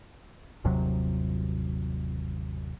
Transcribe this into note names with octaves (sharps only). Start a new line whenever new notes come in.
G1 D#2 C3 F#3